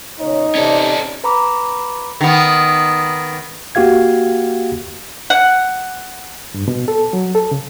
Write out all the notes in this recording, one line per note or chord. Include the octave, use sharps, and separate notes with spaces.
A#2 C#3 D#4 C#5
C3 C#4 A4 D5
B4 A#5 B5 D6
D#3 B3
A#3 F#4 G4 F5 G#6
F#5
G2
B2
A4
F#3
A4
C#3